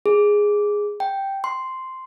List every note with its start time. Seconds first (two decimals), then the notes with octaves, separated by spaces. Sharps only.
0.06 G#4
1.00 G5
1.44 C6